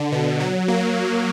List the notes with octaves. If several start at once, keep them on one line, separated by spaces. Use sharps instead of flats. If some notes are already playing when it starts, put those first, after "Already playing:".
Already playing: D3
B2
F#3
A#3